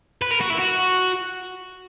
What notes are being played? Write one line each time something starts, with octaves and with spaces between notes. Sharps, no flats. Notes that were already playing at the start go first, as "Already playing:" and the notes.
B4
A#4
F#4
E4
F#4